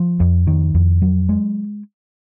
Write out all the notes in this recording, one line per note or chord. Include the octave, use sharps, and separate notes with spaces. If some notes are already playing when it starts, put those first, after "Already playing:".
Already playing: F3
F2
D#3
F2
F#3
G#3